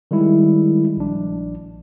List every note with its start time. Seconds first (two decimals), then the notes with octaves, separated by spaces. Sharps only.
0.11 D#3 G3 G#3 E4
0.97 A#1 D4